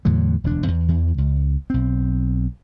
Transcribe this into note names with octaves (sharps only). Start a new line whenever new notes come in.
E2 A2 D3 F#3
E1 D2 D4
E2
E2 E3
C#2
B1 C4